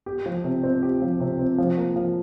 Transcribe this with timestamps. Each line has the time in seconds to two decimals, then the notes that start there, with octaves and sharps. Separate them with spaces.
0.06 G4
0.26 F3
0.44 C3
0.63 C4
0.83 G4
1.02 F3
1.20 C3
1.39 C4
1.58 F3
1.77 A#3
1.96 F3